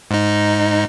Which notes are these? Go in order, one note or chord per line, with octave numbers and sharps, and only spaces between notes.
G#2 D#4